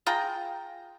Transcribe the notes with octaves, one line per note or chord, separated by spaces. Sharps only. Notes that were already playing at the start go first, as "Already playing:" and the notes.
F4 G#4 G5 A#5